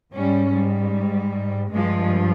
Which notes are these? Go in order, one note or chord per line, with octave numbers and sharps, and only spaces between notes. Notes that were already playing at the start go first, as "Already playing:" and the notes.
G#2 G3 C#4
G3
G2 F3 G#3